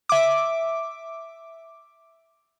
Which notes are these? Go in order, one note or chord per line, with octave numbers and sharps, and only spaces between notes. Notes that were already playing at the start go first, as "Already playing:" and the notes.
E5 D6